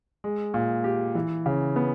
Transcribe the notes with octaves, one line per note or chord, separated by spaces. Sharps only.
G#3
A#2
G4
E3
C#3
B3